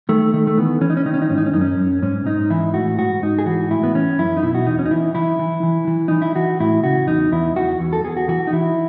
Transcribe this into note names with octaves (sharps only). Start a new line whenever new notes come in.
D#3 A3
D#3 A3
A3
E3 B3
E3 C#4
D#4
C#4
D#3 D#4
C#4
D#4
G#2 C#4
D#4
C#4
F#2 D#4
C#4
F#2
G#2 C#4
G#2 D#4
E3 E4
A2 F#4
G#2 F#4
G#2 D#4
G#4
E3 F#4
A2 E4
B3
E3 C#4
F#2 E4
D#4
B2 E4
F#4
E2 D#4
C#4
D#4
E3 E4
E3 E4
E3
E3
E3
E3 D#4
E4
E3 F#4
A2 E4
C#3 F#4
E2 D#4
E2 E4
E2 F#4
E2
A4
E2 G#4
F#4
E3 F#4
D#4
E3 E4